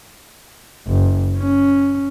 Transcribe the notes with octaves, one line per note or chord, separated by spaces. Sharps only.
F#1
C#4